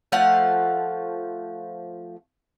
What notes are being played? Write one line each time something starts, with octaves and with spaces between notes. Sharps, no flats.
F3 A3 F5 F#5